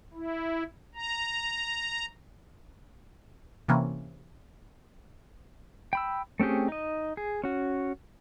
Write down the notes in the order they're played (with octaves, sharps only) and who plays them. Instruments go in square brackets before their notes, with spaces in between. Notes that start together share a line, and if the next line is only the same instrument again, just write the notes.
[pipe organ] E4
A#5
[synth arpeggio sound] C3 E3 A#3 C#4
[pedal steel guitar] G5 B5 E6
A3 C4 C#4 G4 G#4
D#4 D#5
G#4
C#4 F#4